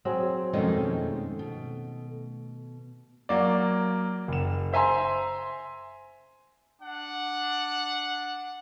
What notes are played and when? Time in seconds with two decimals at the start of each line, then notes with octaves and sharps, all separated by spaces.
0.05 F#3 C4 G#4
0.53 F2 B2 D#3 G#3 A3 C#4 D#4 G5
1.39 B2
3.29 F#3 A#3 D5
4.28 F#1 E7
4.73 C5 E5 G#5 A#5 C6
6.81 D4 F#5